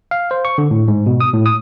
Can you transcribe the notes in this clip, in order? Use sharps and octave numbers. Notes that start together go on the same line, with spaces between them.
F5
C5
C#6
D3
A2
G#2
B2
D#6
A2
D#6